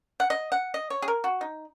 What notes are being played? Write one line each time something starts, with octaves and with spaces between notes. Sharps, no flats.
F#5
D#5
F#5
D#5
C#5
G#4
A#4
F#4
D#4